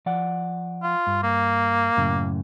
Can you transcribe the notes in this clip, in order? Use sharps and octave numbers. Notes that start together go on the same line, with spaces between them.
F3 D5 F#5
F4
G2
A#3
F#2 A2 C#3